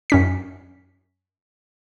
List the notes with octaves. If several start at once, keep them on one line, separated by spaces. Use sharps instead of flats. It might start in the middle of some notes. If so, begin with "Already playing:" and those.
F#2 C#4 B6